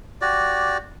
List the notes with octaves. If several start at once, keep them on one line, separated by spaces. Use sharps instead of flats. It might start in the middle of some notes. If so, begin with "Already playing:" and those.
F#4 G4 D5